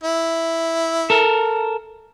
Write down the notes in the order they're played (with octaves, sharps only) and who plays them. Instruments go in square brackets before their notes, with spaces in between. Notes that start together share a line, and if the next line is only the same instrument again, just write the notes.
[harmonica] E4
[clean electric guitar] A4 A#4